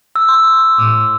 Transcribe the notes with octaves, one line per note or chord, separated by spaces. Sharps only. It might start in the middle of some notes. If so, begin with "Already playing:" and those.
E6
C6
A2 D6